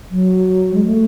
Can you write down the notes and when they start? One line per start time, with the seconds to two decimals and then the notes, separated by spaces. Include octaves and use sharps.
0.10 F#3
0.74 G#3
0.85 A3